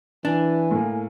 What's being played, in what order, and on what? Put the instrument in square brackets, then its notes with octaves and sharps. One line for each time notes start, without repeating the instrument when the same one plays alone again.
[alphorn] E3 [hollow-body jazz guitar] D4 [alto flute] G#5
[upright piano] A2 A#3